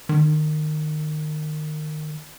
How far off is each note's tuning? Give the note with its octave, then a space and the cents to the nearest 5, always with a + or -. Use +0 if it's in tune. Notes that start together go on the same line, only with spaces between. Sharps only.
D#3 -25